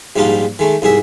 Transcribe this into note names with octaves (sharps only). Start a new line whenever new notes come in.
A#1 G#2 G3 D4 D#4 F4
D#3 G#3 A3
C2 G#2 G#4 E5